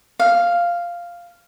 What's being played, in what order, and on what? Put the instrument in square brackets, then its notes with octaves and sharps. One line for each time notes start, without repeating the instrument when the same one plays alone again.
[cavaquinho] F5